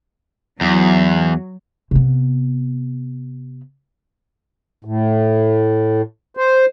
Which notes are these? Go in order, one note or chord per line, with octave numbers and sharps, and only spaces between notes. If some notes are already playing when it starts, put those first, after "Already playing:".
E2 F#3
C3 B3
A2
C5